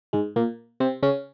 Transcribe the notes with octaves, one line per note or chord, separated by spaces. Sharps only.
G#2 G#3
A#2 A#3
C3 C4
C#3 C#4